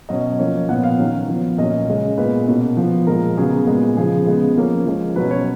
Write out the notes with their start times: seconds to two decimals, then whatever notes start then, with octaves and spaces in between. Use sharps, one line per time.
0.09 B2 F#3 C#4 D#5
0.39 F3 A#3 C#4
0.69 A#2 F3 B3 F#5
0.83 F5
0.99 D#3 F#3 C#4
1.29 F3 B3
1.58 A#2 F#3 C#4 D#5
1.88 C#3 G#3 C#4
2.17 A#2 G#3 B3 B4
2.48 B2 A#3 C#4
2.77 F3 B3
3.07 A#2 F3 G#3 A#4
3.37 C#3 F#3 B3 G#4
3.67 A#2 G#3 B3
3.96 C#3 F3 B3 G#4
4.26 C#3 G#3 B3
4.56 F3 A#3 C#4
4.86 F3 G#3 C#4
5.16 B2 F#3 C#4 B4
5.31 C#5